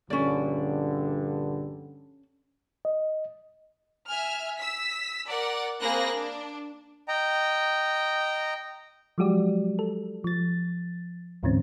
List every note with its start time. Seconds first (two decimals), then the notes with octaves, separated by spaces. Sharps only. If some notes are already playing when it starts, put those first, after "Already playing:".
0.10 A#1 G2 D3 C#4 D5
2.85 D#5
4.07 E5 G#5 F6
4.56 E6 B6
5.26 A#4 D5 F#5
5.81 A#3 C4 G#4 B5 F#6 A#6
6.13 D4
7.08 D#5 G5 A#5
9.18 F3 F#3 G#3 F#4 G4 D5
9.79 A4
10.24 F3 A6
11.43 D2 G#2 D3 E3 C4 C#4